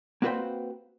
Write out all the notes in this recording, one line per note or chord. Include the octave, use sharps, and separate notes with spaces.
A#3 C4 F#4 B4 C5 G5